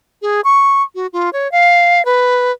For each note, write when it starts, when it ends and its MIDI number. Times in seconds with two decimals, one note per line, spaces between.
0.22 0.41 68
0.44 0.82 85
0.95 1.07 66
1.13 1.29 65
1.33 1.50 73
1.52 2.04 77
2.05 2.51 71